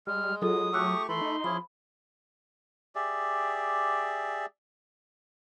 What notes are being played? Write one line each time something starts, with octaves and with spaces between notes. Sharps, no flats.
G3 G#3 F6
F#3 F4 G#4 A4 D#6
A3 G4 C#6 E6 F#6
E3 A3 A4 B5 C6
D#4
F3 C#4 E4 G#4 B5
G4 G#4 D5 E5